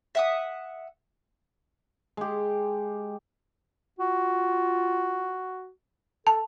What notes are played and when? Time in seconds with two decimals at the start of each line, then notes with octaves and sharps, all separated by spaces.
0.15 E5 F#5 D#6
2.17 G#3 G4
3.99 F4 F#4
6.27 A4 A5